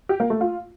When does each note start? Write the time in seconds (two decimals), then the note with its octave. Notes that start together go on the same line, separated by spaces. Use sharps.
0.09 G4
0.20 A#3
0.30 A3
0.41 F4